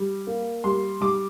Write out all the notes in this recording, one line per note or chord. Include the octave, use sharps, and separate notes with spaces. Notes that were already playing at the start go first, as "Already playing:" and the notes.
Already playing: G3
A#3
G3 C6
G3 D6